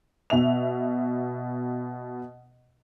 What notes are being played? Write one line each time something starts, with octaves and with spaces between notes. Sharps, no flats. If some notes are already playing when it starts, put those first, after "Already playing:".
B2 E5 F7